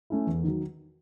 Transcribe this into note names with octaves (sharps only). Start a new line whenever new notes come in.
A3 C#4 E4
E2
D#3 F#3